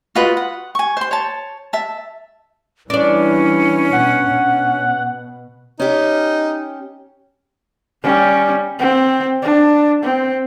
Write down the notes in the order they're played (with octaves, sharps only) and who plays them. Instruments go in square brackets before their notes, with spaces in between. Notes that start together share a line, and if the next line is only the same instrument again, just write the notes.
[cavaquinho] F4 F#4 B4 D#5
F#5
G#5 C#6
C5 C6
C#5 A5
E5 A5
[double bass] E3 G3 [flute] C#4 [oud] D4 D5
[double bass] B2 [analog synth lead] F#5
[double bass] B2
[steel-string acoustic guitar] C#4 G4 [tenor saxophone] D#4
[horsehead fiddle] G3 C#4
C4
D4
C4